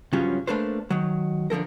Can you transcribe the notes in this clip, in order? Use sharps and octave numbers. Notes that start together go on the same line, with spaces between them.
G2 C#3 F3 F#3 C#4 F4
A3 A#3 D4 A4 B4 C5
D#3 F#3
D3 F3 A4 A#4